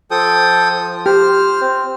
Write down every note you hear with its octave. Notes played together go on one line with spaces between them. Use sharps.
F3 A4 G5 D#6
G4 C5 F6
C4